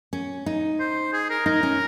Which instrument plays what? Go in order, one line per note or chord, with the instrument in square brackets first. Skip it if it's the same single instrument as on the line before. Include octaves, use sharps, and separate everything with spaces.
[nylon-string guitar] C#4
D#4
[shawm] C5
G#4
A#4
[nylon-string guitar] D#4 [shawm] A#4
[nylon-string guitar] C#4